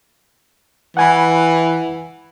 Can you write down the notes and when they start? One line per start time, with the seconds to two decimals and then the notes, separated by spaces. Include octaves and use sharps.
0.97 E3 F#5 G#5 B5